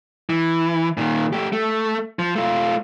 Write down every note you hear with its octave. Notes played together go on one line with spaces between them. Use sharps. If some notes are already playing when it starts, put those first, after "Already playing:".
E3
A#2 D#3
A3 G4
A3
F3
A3 F4